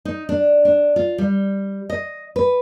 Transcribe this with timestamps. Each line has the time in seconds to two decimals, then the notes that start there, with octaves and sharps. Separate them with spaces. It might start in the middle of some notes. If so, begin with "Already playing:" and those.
0.05 D#4
0.29 D4
0.65 D4
0.96 F4
1.18 G3
1.90 D#5
2.36 B4